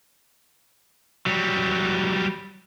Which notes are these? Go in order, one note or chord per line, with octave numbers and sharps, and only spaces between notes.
F#3 G3